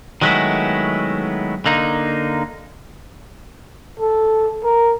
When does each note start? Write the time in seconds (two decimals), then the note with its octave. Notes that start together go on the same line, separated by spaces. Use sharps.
0.22 D#3 F#3 G#3 A3 B3 E4
1.66 D3 A#3 D#4
4.00 A4
4.64 A#4